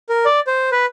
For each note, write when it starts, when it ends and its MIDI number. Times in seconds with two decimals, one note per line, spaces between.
0.09 0.25 70
0.25 0.40 74
0.47 0.70 72
0.72 0.86 71